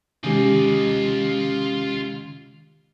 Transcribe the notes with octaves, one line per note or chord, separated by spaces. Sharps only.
C3 D#3 G#3 C#4 F4 G4 D#5